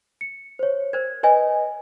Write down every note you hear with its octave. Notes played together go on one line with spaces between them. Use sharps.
C#7
C5 C#5
A#4 C5 G#6
B4 C#5 D#5 E5 G#5